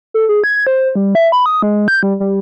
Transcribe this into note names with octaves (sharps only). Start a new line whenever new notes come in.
A4
G#4
G#6
C5
G3
E5
B5
D#6
G#3
G6
G3
G3